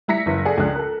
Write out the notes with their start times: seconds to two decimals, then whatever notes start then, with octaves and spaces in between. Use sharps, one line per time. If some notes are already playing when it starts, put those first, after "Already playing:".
0.08 G3 E4 A#5 A#6 B6 C#7
0.26 F#1 E4 B4
0.45 G#4 A4 D5 F#5
0.58 C#2 F3 D4 F4 G#4 F#6
0.76 A4 A#4